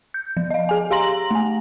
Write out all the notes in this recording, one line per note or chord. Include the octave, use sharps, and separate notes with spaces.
G6
F3
D#5 F5
G#4 G#5
G4 F5 A#5 C6 A#6 F#7
A3 G#5